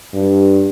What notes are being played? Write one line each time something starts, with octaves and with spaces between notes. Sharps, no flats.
G2